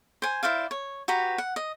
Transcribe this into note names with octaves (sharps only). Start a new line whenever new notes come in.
C5 G#5
E4 C5 D5 F5
C#5
F#4 G4 B4 A#5
F#5
D#5